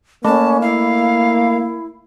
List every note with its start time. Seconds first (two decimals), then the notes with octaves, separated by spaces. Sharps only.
0.25 A3 A#3 C#4 A5
0.62 E4 F5